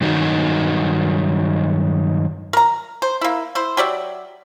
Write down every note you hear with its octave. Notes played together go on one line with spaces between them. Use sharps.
G2 D#3 F#3 D#4 F#4
A#4 A#5
C5
A#3 E4
E4 C5
F#3 G4 D5 E5